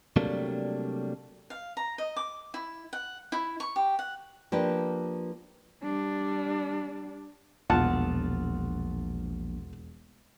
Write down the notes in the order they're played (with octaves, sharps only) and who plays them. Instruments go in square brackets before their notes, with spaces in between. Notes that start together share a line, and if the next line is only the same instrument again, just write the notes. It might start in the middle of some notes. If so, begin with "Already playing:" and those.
[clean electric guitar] C3 F#3 G3 A3 A#3 D4
[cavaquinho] F5
A#5
D#5
D6
E4
F#5
E4
C#6
G4
F#5
[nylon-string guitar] F3 A#3 D4 G4 B4
[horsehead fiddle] G3 D4
[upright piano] E1 [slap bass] A#1 [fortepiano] F4 F#5 A5